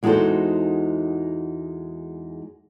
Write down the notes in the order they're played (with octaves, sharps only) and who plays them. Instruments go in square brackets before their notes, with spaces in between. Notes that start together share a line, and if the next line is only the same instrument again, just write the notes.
[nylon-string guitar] E2 G#3 D#4 F#4 A4 C5